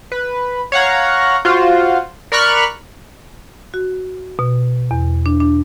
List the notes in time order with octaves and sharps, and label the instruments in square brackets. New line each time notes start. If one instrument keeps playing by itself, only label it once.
[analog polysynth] B4
C#5 F5 F#5 A#5
F4 F#4 C5
A#4 D5 B5 C#6 F6 F#6
[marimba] F#4
B2
E2
D4
D4